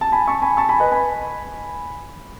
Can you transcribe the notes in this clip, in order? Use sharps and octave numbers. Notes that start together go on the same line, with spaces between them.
A5
G#5 B5
A5 C#6
G#5 B5
A5 C#6
G#5 B5
B4 D#5
G#5 B5